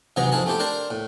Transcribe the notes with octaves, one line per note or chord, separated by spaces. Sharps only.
G#2 C3 E3 F#3 G#4 A#5
F2 G#2 E4 G#4 A4 A5
A3 C4 E4 G4 A4
D4 A#4 C5 A5
A2